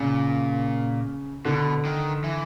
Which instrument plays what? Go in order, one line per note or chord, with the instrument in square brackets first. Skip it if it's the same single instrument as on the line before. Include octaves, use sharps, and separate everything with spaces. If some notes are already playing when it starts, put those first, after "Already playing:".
Already playing: [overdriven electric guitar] A#2 [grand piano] C#3
[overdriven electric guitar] B2 [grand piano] D3
[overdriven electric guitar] D#3
E3